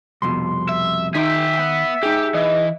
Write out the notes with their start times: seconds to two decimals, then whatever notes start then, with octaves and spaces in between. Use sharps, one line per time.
0.22 C2 F2 B2 C6
0.69 E5
1.15 D#3 D#4 G#4 E5 G5 C6 B6
1.59 B3
2.03 D#4 G4 G#4
2.34 E3 D#5